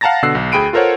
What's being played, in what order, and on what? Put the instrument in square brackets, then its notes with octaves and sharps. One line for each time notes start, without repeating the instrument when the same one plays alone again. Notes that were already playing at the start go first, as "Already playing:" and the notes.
[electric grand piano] F5 F#5 A5 A#5 A6 A#6
B2 D3 F#5 E6 F#6 C7
B1
D2 G#4 G5 B5 D7 D#7
F4 A4 A#4 C5 C#5 F#5